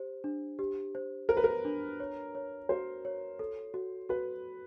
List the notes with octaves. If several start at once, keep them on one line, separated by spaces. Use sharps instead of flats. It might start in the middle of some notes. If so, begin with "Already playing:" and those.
Already playing: G4 C5
D4
G4
C5
A#4 C5
B4
A#4
D4
C#5
C#5
F#4 C5
C#5
A4
F#4
F#4 B4